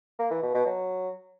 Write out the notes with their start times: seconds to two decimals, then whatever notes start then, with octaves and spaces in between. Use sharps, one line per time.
0.19 A#3
0.31 E3
0.42 B2
0.54 B2
0.66 F#3